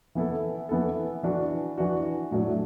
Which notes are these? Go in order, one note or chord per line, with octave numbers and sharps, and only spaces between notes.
E3 B3 E4 A4
E3 B3 E4 A4
E3 D4 F#4
E3 D4 F#4
A2 F#3 A3 D4